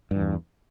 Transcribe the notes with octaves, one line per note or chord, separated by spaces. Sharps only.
E2 G2 E3